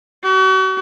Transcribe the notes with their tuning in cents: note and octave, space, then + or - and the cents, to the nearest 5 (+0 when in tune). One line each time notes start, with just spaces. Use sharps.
F#4 +40